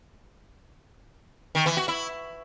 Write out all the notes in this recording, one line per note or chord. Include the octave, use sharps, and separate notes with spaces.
D#3
E3
F#4
E4